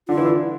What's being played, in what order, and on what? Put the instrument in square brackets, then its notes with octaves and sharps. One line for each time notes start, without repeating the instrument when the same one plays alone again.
[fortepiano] D3 D4 [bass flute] F4
[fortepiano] E3 E4
D3 D4